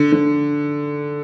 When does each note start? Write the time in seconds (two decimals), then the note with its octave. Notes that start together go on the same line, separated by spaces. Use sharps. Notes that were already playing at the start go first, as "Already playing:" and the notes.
Already playing: D3
0.12 D3